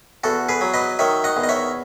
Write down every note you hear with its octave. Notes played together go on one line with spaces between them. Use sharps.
E2 F#4 A4
G#4 B4
F#3
B4 D#5
D#3 C#5 E5
D#5 F#5
E2
D#5
C#5 E5